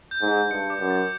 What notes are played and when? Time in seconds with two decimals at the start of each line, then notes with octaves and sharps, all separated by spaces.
0.11 G6
0.22 G#2
0.32 G6
0.51 G2 C#7
0.70 D6
0.80 F#2
0.90 A6